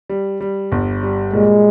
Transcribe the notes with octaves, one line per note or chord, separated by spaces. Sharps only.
G3
G3
G1
G3
A#2 G#3